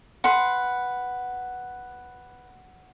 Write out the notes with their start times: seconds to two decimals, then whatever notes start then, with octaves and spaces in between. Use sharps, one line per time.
0.24 B4 F#5 C6